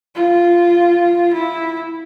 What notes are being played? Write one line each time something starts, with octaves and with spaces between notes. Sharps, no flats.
F4
E4